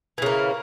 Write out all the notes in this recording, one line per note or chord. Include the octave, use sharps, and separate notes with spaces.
C#3 E3 A#3